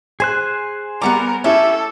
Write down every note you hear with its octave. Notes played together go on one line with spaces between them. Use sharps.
G#4 C5 G#5 F#6
G3 B3 A#4 F#5 A#5 D6
A3 C#4 E4 G4 A4 E5